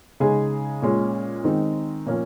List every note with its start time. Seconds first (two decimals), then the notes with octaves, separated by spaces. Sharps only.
0.20 C#3 G#3 D#4 G#4
0.82 A#2 G#3 C#4
1.44 D#3 G#3 C4 D#4
2.06 A#2 F3 A#3 C#4